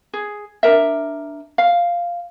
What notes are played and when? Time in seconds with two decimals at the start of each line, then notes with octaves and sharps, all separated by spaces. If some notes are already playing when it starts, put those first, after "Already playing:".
0.13 G#4
0.63 D4 D#4 A#4 E5
1.58 F5